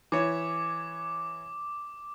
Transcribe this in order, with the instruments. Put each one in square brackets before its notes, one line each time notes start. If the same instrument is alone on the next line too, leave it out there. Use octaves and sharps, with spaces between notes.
[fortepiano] E3 C#5 [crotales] D6